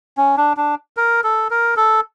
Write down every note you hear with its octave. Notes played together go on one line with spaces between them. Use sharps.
C#4
D4
D4
A#4
A4
A#4
A4